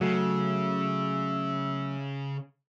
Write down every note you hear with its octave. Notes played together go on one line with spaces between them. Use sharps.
C#3 F#3 A3 E5